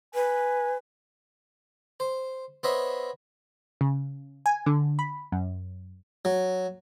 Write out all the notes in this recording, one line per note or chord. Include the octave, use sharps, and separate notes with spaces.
B4 G#5
C5
B3 C5 C#5 D#5 E5
C#3
G#5
D3
B5
F#2
F#3